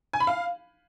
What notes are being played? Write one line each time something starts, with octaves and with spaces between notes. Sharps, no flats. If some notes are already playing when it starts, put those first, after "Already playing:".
G#5
B5
F5